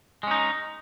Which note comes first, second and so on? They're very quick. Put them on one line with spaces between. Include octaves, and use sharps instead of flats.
G#3 C#4 D#4